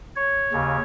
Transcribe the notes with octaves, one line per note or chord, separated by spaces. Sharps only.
C#5
D#2 C#3